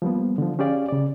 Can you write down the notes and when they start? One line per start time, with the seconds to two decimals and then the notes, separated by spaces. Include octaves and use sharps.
0.02 F3 G3 A#3 B3
0.38 D3 F3
0.59 C#4 G4 G#4 D5 F5
0.88 C#3 D5